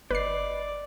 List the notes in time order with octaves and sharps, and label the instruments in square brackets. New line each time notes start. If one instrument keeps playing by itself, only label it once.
[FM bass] G1 [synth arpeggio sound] B4 C7 [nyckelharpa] D5 [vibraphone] D#5 B5 D6